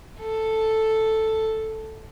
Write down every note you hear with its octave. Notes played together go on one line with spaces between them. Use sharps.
A4